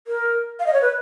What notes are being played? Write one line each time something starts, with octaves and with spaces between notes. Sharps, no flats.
A#4
F5
D#5
C#5
B4